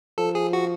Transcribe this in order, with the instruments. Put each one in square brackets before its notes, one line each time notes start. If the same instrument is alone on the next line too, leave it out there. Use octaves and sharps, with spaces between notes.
[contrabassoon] F3 [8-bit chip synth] A4
[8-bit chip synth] G#4
F#4